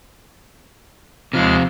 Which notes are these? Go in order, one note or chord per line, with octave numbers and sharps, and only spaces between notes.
D#2 C3 F3 G#3 F4 F6